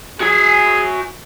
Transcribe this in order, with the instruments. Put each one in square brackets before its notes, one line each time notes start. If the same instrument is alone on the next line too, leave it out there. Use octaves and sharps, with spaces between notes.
[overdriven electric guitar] F#4 G#5 [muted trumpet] G#4